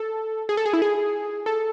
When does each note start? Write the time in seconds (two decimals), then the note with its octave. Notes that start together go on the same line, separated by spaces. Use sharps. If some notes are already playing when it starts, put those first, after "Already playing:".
Already playing: A4
0.49 G#4
0.57 A4
0.66 G#4
0.73 E4
0.82 G#4
1.46 A4